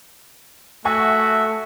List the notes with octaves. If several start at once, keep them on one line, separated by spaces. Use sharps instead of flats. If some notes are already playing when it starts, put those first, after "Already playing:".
A3 F#4 E5 F#5 G#5 C#6